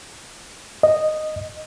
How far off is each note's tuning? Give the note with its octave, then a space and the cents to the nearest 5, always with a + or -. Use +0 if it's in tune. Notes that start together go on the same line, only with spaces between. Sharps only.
D#5 -5